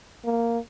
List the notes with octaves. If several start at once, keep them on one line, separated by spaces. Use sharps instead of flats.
A#3